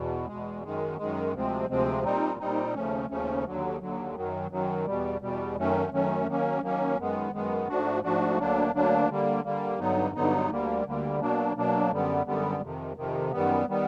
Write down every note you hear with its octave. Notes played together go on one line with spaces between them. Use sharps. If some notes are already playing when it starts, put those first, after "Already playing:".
Already playing: E2 B2
E2 B2 G#3
F#2 D#3 G#3
F#2 D#3 G#3
D2 C3 F3 G#3 C4
D2 C3 F3 G#3 C4
A#2 G3 C4 D#4
A#2 G3 C4 D#4
D#2 C#3 F3 A3 C#4
D#2 C#3 F3 A3 C#4
D#2 D3 F#3
D#2 D3 F#3
F#2 D#3 F#3
F#2 D#3 F#3
E2 B2 G3
E2 B2 G3
F#2 D#3 F#3 A3 C#4
F#2 D#3 F#3 A3 C#4
D#3 F#3 A#3 C#4
D#3 F#3 A#3 C#4
F#2 D#3 G#3 B3
F#2 D#3 G#3 B3
G#2 F3 A3 D4 F#4
G#2 F3 A3 D4 F#4
D2 D3 F#3 A#3 D4
D2 D3 F#3 A#3 D4
D3 G3 A#3
D3 G3 A#3
G2 D3 F#3 B3 D#4
G2 D3 F#3 B3 D#4
D2 D3 G3 A#3
D2 D3 G3 A#3
B2 F#3 A#3 D4
B2 F#3 A#3 D4
F#2 D3 G3 B3
F#2 D3 G3 B3
F2 C3 D#3
F2 C3 D#3
F#2 D#3 G3 B3
D#3 G3 B3